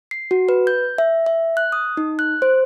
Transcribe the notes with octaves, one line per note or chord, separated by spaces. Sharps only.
C7
F#4
B4
G6
E5
E5
F#6
D#6
D#4
F#6
C5